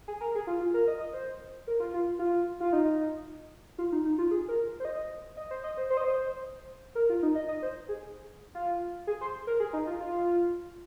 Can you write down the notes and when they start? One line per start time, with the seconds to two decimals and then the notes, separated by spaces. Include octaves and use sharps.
0.08 G#4
0.21 A#4
0.35 G#4
0.47 F4
0.60 F4
0.74 A#4
0.87 D#5
1.00 D#5
1.13 C5
1.67 A#4
1.80 F4
1.94 F4
2.19 F4
2.60 F4
2.73 D#4
3.78 F4
3.92 D#4
4.05 D#4
4.18 F4
4.31 G#4
4.48 A#4
4.80 C5
4.85 D#5
5.37 D#5
5.51 C5
5.64 D#5
5.77 C5
5.90 C5
5.97 D#5
6.04 C5
6.95 A#4
7.10 F4
7.22 D#4
7.35 D#5
7.49 D#5
7.63 C5
7.89 G#4
8.55 F4
9.07 G#4
9.21 C5
9.47 A#4
9.60 G#4
9.73 D#4
9.87 F4
10.00 F4